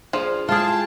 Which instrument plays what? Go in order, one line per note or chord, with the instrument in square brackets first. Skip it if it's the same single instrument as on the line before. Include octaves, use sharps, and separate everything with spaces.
[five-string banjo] F3 [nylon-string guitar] D4 G#4 C5
[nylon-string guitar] G#3 E4 [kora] F4 G#4 [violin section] G5 A5